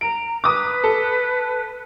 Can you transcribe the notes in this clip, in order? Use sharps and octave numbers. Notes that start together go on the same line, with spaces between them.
A#5 D7
B4 D6 D#6
A4